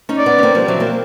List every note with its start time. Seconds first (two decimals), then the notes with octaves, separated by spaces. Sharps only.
0.09 C#4 D#4
0.18 D5
0.26 B3 C#4
0.38 C#4
0.43 A#3 C4
0.55 F3 G3
0.68 E3 F#3
0.80 A#3 C4